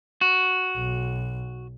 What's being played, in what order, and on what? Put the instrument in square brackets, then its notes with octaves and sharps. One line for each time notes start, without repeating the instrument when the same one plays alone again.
[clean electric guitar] F#4
[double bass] B1